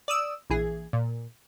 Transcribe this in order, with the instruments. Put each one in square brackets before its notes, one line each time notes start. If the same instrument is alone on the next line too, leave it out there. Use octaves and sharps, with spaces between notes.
[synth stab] D5 D#6 E6
A#1 E3 G#4
A#2